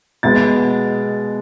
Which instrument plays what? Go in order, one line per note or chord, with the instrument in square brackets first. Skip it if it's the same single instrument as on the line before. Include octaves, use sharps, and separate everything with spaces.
[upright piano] B2 G#3 B3 A6